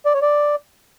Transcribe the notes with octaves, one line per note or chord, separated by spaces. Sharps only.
D5
C#5
D5